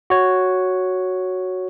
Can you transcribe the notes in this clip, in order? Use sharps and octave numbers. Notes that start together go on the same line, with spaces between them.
F#4 C#5